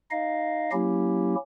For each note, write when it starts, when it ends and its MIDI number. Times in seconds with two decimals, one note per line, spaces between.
0.11 0.70 63
0.11 0.70 75
0.11 0.70 77
0.72 1.35 54
0.72 1.35 58
0.72 1.35 61
0.72 1.35 64
0.72 1.35 67